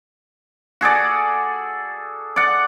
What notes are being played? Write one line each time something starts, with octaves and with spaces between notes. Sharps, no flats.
F#4 G#4 A4 D5
D5 F#5